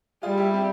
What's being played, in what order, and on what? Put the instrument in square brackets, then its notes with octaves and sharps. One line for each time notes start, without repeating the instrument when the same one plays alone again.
[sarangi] G3 [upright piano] F4 G#4
[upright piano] E4 G4
C4 E4